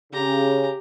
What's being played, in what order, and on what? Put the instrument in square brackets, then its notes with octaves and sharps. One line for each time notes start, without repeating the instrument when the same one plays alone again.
[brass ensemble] C#3 [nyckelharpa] G4 A#5